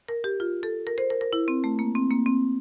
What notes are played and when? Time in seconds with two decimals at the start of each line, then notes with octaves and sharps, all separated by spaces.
0.08 A#4
0.24 G4
0.40 F4
0.63 A4
0.87 A#4
0.98 C5
1.10 A#4
1.21 A#4
1.33 E4
1.48 C4
1.64 A3
1.79 A#3
1.95 C4
2.10 A#3
2.26 C4